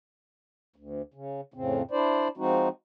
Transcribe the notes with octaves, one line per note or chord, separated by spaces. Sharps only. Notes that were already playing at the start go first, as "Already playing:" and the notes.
D2
C#3
F2 A2 C#3 C4
D4 E4 C5 D5
F3 G#3 C4 D#4 F#4